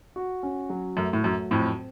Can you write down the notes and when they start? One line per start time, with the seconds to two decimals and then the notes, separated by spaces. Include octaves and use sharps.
0.16 F#4
0.43 C#4
0.69 F#3
0.97 F#2 A3
1.13 A2
1.24 F#2 F#3
1.50 F2 A2 C4